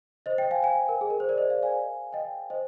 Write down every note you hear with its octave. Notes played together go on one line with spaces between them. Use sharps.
C5 D#5
D#5 G5
F5 G#5
F5 G#5
A#4
G#4
A#4
C5
A#4 D5
C5 D#5
D5 F5
F5 G#5
D#5 G5
C5 D#5